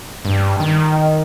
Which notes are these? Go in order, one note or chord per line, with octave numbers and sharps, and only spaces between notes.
G2
D#3